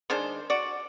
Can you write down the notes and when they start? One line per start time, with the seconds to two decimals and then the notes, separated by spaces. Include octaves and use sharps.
0.10 D#3 G#3 D4 C5
0.50 F#4 D5